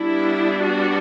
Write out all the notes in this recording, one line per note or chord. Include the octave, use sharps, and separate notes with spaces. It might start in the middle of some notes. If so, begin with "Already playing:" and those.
Already playing: G3 B3 D4 E4
F#4